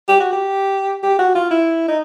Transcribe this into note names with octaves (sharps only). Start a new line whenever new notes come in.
G4
F#4
G4
G4
F#4
F4
E4
D#4